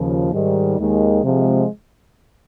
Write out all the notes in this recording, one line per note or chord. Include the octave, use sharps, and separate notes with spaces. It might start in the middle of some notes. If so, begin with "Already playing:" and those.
Already playing: D#2 C#3 F3
G#2 D#3 G3
D#2 D#3 G#3
C3 F3 G#3